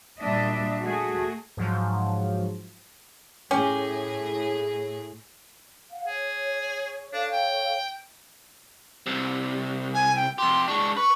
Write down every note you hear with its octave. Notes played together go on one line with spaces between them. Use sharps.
A#2 F#3 G3 D4 D#5 E5
A3 F#4 G#4
G#2 F3 F#3
A2 C#4 G4 G#4
F5 F#5
G#4 C#5
D4 A4 C#5 F5
G5
C2 C3
G#5
G5
F2 G4 C6
G#3 D4 C#6
B4 C#6